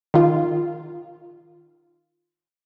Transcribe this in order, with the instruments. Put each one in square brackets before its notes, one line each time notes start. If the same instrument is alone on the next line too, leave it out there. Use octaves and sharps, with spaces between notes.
[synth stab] D#3 F4